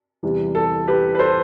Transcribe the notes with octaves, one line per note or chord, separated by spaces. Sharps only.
E2 C3 E3 G3
A4
G4 B4
B4
A4 C5